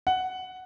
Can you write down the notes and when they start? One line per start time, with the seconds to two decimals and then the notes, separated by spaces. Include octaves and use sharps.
0.07 F#5